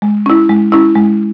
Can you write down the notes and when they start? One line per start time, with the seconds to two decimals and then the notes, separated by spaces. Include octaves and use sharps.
0.02 G#3
0.26 C#4 E4
0.49 G#3
0.72 C#4 E4
0.96 G#3